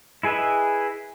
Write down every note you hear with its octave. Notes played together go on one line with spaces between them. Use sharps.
E4 G#4 B4 D#5 E5